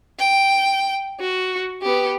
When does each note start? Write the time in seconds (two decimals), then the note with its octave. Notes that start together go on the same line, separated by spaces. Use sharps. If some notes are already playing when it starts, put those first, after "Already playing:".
0.19 G5
1.20 F#4
1.82 B3 G4